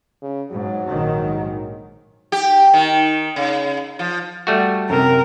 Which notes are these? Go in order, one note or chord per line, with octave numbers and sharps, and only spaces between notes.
C#3
G#2 F#3
A#1 G#2 D#3
G4
D#3
C#3
F3
G3 A3 F#4
F#2 C3 A#4